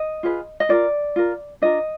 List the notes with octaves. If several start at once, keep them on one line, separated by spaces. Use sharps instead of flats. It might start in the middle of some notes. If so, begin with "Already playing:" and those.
Already playing: D#5
F4 G#4 B4
D#5
F4 A#4 D5
F4 A#4
D4 F4 A#4 D#5